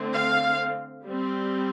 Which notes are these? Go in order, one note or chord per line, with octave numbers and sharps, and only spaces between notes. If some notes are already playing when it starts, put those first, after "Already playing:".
Already playing: D3 A3 C4
F5
G3 C4